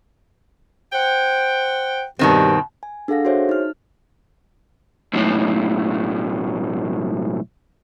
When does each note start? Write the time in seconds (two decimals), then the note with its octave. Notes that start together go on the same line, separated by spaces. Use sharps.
0.93 C5 F#5 G5
2.19 G2 B2 D#3 C4
2.83 G#5
3.08 D4 G#4 A4 F5 F#5 A#6
3.25 F#4 G#4 C5 C#5 E5
3.49 D#4 F6
5.14 B1 A2